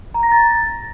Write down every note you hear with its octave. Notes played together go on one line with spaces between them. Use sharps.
A#5
A#6
A6